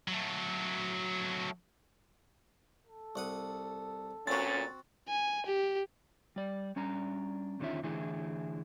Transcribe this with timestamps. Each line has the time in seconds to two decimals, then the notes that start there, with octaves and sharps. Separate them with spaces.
0.08 F#3 A3
2.86 A4
3.16 C2 F#5 D#6
4.27 D2 A#2 C4 C#4 F#4 A6
5.08 G#5
5.46 G4
6.36 G3 D5
6.76 G3 C#4 D4 A#5
7.60 E2 D3 D#3 C#4 F4 E5
7.83 D3 E3 A3 E4 G#4